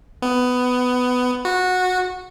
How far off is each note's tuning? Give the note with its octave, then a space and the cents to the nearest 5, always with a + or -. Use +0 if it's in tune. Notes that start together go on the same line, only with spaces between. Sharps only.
B3 +15
F#4 -15